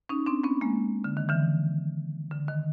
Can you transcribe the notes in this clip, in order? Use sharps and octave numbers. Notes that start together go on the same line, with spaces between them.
C#4 D#4
C4 D4
B3 C#4
G#3 A#3
D3
D#3
D3 E3
D3
D#3